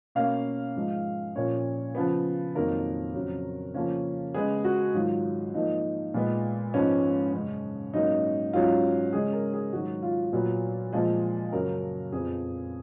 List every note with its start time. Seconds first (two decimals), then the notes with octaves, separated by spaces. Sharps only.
0.15 B2 A#3 C#4 F5
0.76 G#2 F3 G#3
1.35 A#2 F3 A#3 C#4 C#5
1.95 C#3 F3 B3
2.55 F2 D#3 F#3 A#3 A#4
3.15 F2 C#3 F#3
3.74 C#3 F3 A#3 C#4
4.34 C#3 G#3 B3 G#4
4.64 F#4
4.94 G#2 D#3 F#3 F4
5.54 G#2 F3 A#3 D#4
6.14 A#2 G#3 B3
6.74 G#2 F3 G#3 B3 C#4
7.33 F#2 C#3 G#3 C#4
7.93 G#2 F#3 A#3 C#4 D#4
8.53 G#2 F#3 C#4 F4
9.13 C#3 G#3 C#4 G#4
9.33 A#4
9.53 G#4
9.73 G#2 D#3 F#3 F#4
10.02 F4
10.33 A#2 F#3 B3
10.93 A#2 F3 G#3
11.52 F#2 C#3 F#3 A#4
12.12 F2 F3 B3 G#4